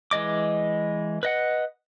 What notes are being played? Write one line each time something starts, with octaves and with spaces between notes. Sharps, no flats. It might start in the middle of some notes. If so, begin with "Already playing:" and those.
E3 G#3 D#5 D6
B4 D#5 F#5